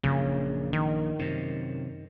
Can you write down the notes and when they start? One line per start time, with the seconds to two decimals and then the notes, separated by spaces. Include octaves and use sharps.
0.03 A#1 F#2 C#3
0.73 D#3
1.19 F#2 C3